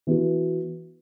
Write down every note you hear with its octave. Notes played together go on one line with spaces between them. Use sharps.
E3 B3 F#4